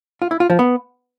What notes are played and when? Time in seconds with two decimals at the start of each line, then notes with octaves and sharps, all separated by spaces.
0.22 F4
0.31 E4
0.40 F4
0.50 F3
0.59 B3